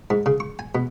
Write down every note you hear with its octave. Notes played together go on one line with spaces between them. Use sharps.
G#2
C#3
C#6
G#5
B2